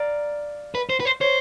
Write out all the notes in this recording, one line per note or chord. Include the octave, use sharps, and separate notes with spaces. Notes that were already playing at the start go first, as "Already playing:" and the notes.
Already playing: D5 F5 A#5
B4
C5
B4
C5
C5 C#5